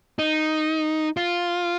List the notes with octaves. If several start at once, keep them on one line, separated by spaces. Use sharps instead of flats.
D#4
F4